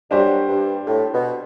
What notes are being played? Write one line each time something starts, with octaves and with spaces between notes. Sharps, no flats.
F#2 F#3 G3 D4 G4 C5
G2
A2
B2